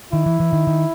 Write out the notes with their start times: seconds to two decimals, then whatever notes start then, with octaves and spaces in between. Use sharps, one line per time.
0.12 D#3 E4
0.26 E3
0.40 E3
0.53 D#3
0.67 D#3